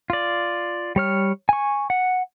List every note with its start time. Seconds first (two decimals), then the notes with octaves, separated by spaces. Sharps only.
0.10 F4 D5
0.96 G3 C#5 F6
1.49 G#5 C#6
1.90 F#5